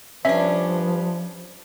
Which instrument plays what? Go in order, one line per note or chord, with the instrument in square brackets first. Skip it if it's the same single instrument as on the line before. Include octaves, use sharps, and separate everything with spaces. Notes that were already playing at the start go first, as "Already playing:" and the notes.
[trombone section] G2 G3 B4 [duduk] F3 [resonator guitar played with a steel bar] C#4 D4 [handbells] E5